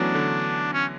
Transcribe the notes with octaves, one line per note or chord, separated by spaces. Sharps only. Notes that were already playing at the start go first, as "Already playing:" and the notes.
Already playing: E3 F#3 A3 B3 C#4 D4
D3
C#4